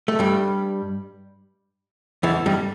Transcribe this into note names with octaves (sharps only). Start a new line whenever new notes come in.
A3
G2 G3
E2 E3
G2 G3